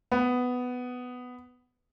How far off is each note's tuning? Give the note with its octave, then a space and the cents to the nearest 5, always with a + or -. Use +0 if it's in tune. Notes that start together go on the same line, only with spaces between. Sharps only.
B3 +10